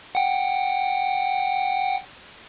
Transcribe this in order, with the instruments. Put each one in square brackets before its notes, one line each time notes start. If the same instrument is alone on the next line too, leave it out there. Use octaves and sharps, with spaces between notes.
[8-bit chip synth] F#5 G5